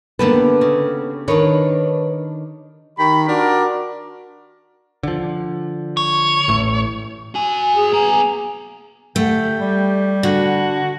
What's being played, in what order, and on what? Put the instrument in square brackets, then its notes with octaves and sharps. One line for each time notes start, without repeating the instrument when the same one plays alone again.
[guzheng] D3 G4 A5 [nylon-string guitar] A#3 B3 B4
[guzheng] C#3
[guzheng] D#3 D4 [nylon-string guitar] A#4 B4 C#5
[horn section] D#3 G4 B5
D4 F#4 A#4
[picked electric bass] D3 F3
[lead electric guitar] C#5
[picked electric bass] A1 A2
[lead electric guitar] F#4 G#5
[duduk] G#4
[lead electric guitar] B3 A#5 [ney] G#5
[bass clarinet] D3 [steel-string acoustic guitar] A3 [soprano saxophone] G4
[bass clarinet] G3
[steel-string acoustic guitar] D3 [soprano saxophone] F#4